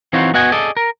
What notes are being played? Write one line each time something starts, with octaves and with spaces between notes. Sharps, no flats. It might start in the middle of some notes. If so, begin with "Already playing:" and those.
E3 C4 D#4 F4 F#4 C#5
B3 F#4 D#5 F#5 G#5
G#4 A4 D5 D#5
A#4